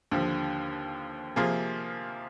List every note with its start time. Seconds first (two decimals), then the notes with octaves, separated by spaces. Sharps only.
0.11 D#2 D3 F3
1.36 C3 F3 A#3 F4 G#4